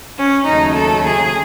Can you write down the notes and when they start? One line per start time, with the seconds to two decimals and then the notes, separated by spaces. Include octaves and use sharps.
0.17 C#4
0.48 D#2 C#3 F#3 A3 D#4
0.77 A4
1.06 G#4